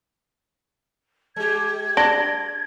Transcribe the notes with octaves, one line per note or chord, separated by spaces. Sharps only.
G#3 G4 G#6
D4 A#6 D7 G7